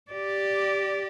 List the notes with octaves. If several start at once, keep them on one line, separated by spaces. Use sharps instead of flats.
G4 D5